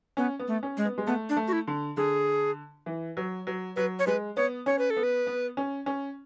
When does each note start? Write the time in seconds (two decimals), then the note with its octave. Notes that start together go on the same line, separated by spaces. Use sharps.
0.17 B3 C#4
0.39 B3
0.48 A3
0.63 C#4
0.77 G#3
0.85 B3
0.98 G#3
1.07 A3 B3
1.29 D4
1.36 A3
1.48 F#4
1.53 E4
1.67 D3
1.97 D3 G#4
2.86 E3
3.17 F#3
3.47 F#3
3.76 F#3 B4
3.99 C#5
4.07 G#3 B4
4.37 B3 C#5
4.66 C#4 C#5
4.79 B4
4.90 A4
4.97 B3
5.03 B4
5.27 B3
5.57 C#4
5.86 C#4